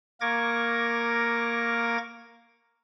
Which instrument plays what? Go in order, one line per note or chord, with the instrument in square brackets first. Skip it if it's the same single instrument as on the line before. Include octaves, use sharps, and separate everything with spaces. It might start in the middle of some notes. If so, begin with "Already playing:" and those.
[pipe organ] A#3 A#4 C#6 D6 G#6 A#6